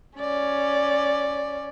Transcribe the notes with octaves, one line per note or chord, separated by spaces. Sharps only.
C#4 D5